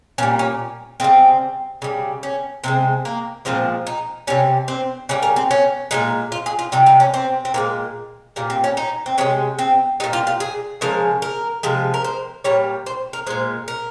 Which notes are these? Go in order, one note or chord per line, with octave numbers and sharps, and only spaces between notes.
A#2 G3 C#4
C#4
C#3 G3 C4
C#3 G3
C#4
C3 F3 G#3 C4
A#3
A#2 F3 G#3 C4
D#4
C3 G3 C#4
C4
C#3 G3 C#4
A#4
C4
C#4
A#2 F3 G#3 D#4
F4
G#4
F4
C3 G3 D#4
D#4
C#4
C4
C4
A#2 F3 G#3 A#3
A#2 G3 A#3
C4
C#4
D#4
C4
C3 F3 G#3 C#4
C4
A#2 G3 D#4
F4
F4
G#4
C#3 F3 G#3 A#4
A#4
C3 F3 G#3
A#4
C5
A#2 G3 C#5
C5
A#4
A#2 G#3 C5
A#4